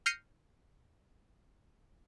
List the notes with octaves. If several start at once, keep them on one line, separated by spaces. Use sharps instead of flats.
F6 G6 A#6 C7 C#7 D#7